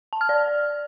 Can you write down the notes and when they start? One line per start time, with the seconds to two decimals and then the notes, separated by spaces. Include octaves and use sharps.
0.13 A5
0.21 F6
0.29 D5